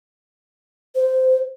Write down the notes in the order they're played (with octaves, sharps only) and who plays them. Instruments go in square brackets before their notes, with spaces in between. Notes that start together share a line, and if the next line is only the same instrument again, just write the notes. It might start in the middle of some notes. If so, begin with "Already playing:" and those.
[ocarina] C5